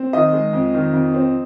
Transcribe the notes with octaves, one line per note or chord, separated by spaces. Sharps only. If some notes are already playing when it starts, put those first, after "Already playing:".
Already playing: C4
D#3 D#5
G#3
F2
D#3
F2
C4